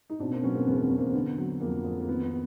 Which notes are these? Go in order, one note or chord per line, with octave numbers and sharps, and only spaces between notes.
D#4
B2 C4 D4
A#3 C4
F#3 B3 C#4
A#3 C4
E2 B3
C4
B3 C#4
E2
A#3 C4
D3 B3
F#3
F2 A#3
F2
A#3
D#3 B3
B3